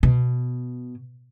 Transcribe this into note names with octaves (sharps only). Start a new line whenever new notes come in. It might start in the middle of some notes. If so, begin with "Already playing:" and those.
B2